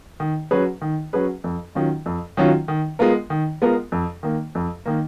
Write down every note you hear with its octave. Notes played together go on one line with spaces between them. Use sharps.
D#3
F#3 C#4 G#4 B4
D#3
F#3 C#4 G#4 B4
F2
D#3 F#3 C#4 F4
F2
D#3 F#3 C#4 F4
D#3
G#3 B3 F4 A#4
D#3
G#3 B3 F4 A#4
F2
D#3 A#3
F2
D#3 A#3